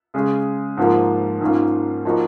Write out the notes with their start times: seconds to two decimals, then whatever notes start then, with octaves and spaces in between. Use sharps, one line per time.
0.14 C#3 G#3 C#4 G#4
0.77 G#2 F3 A#3
1.41 G#2 D#3 A#3 C#4 F4
2.05 F3 A#3 D#4 F#4